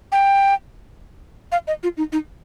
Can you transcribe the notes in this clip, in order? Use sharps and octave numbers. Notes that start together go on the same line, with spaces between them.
G5
F5
D#5
F4
D#4
D#4